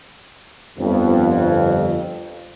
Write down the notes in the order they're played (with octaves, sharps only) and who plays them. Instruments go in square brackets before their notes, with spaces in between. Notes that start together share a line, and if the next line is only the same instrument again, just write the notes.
[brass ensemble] G1 F2